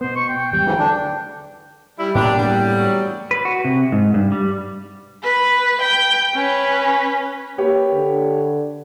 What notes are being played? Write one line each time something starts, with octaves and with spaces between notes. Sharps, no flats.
B2 B3 C5
C#6
G5
G#1 E2 G3 G5
D2 G#2 C#3 E3 F#3
D3 D4
G3 E4
A2 A#3 B3 D4 G4
E2 G2 G3 G4
F#3
B4
F#4
C3
G#2
G2
G3
B4
G5
C#4 B4
A#3 G4 B4 C#5
D3